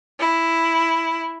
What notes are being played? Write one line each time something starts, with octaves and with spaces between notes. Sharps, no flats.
E4